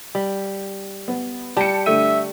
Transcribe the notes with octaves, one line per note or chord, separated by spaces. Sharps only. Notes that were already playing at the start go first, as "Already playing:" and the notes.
G3
B3
G3 G5 A5 C#7
D3 A3 E5 D#7